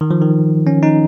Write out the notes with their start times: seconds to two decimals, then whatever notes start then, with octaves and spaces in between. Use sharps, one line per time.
0.01 D#3
0.11 F3
0.21 D#3
0.67 C#4
0.83 D#4